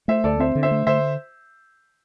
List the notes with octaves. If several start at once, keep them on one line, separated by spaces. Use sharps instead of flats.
A3 C5 E5
D2 A4 D5
C4 C5 E5
D3
C5 E5
A3
D3 C5 E5